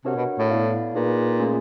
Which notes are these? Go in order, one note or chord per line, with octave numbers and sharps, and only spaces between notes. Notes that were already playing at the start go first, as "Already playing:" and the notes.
C3 D4 F#4 A#4 C#5 F#5
B2
A2
B3 E4 A4 D5 F5
A#2 D#4 G#4 B4
A3 C#4 F4 G#4